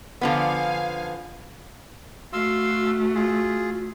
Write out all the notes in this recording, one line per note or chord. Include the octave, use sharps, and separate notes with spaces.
D3 F3 B3 F5 G#5
A3 F#4 F5 C6 E6
F4 G#4